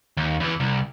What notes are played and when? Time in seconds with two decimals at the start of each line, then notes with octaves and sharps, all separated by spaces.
0.17 D#2
0.40 E2 E3
0.60 C2